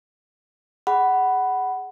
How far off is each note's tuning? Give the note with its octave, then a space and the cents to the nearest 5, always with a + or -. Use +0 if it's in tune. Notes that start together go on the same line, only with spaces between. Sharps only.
G#4 +0 F#5 +15 B5 +0